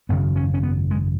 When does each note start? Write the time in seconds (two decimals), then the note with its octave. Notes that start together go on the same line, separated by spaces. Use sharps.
0.09 G#1 F#2 C#3 B3
0.36 C#4
0.54 C#4
0.63 B3
0.91 G#3